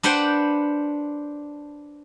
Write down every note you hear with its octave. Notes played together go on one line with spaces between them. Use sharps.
D4 B4 C5 F#5 G5